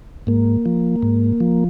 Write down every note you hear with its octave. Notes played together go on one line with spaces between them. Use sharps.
G#2 A#3
F3
G#2
F3